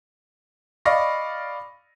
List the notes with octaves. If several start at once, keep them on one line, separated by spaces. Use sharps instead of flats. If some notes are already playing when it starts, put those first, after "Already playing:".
D5 D#5 F5 B5 C#6 A#6